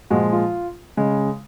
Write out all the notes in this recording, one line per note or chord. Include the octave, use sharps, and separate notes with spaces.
A#2 F3 G#3 F#4
F4
C#3 G#3